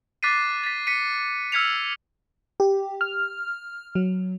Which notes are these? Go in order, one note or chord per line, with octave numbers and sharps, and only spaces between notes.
D6 F#6 A6 B6 C7 D#7
A6 B6
B6 C#7 D#7
E6 F6 G#6 B6 C#7 F7
G4
F6
F#3